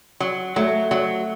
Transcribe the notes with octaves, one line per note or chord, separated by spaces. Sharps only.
F#3
F#3 A3
F#3